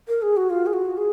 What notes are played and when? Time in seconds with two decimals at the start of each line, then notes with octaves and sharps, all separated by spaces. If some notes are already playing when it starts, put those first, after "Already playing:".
0.08 A#4
0.22 G#4
0.37 F#4
0.50 F4
0.66 G#4
0.73 F#4
0.97 G#4